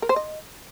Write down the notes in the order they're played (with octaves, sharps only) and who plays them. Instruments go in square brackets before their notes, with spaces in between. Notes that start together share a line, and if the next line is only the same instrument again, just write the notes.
[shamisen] A#4
C5
D#5